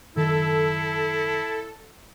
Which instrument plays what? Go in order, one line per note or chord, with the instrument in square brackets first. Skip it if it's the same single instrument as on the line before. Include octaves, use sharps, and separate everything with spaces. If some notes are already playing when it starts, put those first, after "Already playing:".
[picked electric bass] F#1 F#2 D#3 [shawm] E4 [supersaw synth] A4